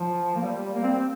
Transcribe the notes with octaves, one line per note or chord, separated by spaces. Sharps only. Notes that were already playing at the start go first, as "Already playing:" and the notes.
Already playing: F3
A#3
G3
A#3
C4
C4